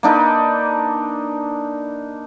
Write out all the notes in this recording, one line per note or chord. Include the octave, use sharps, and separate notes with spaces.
A#3 D4 D#4 B4